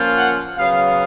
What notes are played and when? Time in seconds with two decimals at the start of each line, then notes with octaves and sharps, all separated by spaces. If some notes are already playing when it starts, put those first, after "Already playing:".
Already playing: F3 A#3 C#4 F4
0.15 F#5
0.57 C#3 F#3 B3 F5